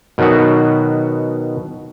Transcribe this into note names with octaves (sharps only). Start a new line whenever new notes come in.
B2 D#3 F#3 B3 F#4